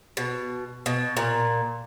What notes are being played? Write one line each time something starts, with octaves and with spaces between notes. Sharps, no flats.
B2
B2
A#2